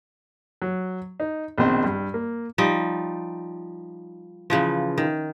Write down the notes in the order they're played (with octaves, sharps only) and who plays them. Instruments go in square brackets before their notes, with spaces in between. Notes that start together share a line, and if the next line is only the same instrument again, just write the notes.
[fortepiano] F#3
D#4
A#1 B2 D#3 C4 D#5
G2
A#3
[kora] F3 G3 D#4
C#3 E3 F3
D#3